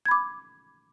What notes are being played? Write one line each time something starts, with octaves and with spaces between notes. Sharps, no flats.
B5 D6 G#6